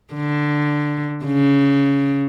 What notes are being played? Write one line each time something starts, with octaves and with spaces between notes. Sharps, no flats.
D3
C#3